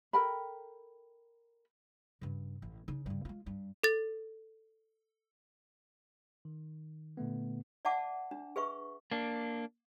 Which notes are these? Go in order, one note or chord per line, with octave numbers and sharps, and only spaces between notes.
A4 A#4 G5 B5
G2 C#3
A1
C#3 D#4
G2 C#3
G#3 F4
G2
A4 A6
D#3
A#2 D3 A3 B3
D5 E5 F#5 A5 D6
D4
G#4 B4 E5 C#6
A#3 D4